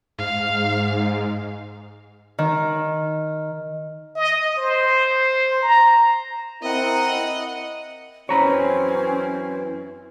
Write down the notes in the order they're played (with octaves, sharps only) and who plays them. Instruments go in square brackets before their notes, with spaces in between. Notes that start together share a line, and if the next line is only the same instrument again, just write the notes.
[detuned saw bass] G#2 [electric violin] F5
[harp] D#3
[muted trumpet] D#5
C5
A#5
[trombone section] C4 E4 A#4 [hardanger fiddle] D#5 F#5
[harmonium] F#2 E3 E4 [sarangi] C4 [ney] C#4 [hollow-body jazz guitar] C#5 A#5 B5